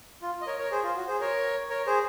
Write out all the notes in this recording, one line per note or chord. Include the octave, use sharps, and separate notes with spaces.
F4
D#5
A#4 C#5
A#4 C#5
G#4 C5
F4
F#4
G#4 C5
A#4 C#5
A#4 C#5
G#4 C5